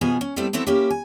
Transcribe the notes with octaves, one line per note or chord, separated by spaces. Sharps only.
B2 F3 B3 G#4 G#5
C#4
G3 A3 B3 C4 E4
E3 A3 B3 C4 E4
A#3 C#4 E4 G4
G#5